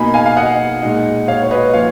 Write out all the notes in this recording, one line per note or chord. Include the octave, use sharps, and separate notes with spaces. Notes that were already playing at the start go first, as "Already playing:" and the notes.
Already playing: B2 A#3 D#4 G#5 B5
F5 G#5
F5
D#5 F#5
A#2 G#3 D#4
C#5 F5
C#5
B4 D#5
A#2 F3 C#5 F5